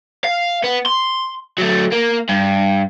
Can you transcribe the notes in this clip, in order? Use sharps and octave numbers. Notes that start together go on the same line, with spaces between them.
F5
B3
C6
F#3 A3
A#3
G2